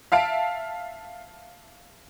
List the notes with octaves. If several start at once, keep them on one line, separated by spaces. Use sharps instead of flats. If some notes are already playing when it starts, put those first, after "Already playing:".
E5 F5 A5 D7